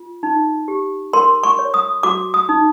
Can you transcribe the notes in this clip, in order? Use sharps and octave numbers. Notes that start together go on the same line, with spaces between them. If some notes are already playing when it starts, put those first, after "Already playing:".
Already playing: F4
D#4
G4
A#4 C6
C#6
C#5
D#6
F#4 D6
D#6
D#4